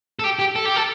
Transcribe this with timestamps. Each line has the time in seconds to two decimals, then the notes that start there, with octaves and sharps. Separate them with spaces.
0.19 A4
0.24 G4
0.39 G4
0.56 A4
0.66 G4
0.76 A4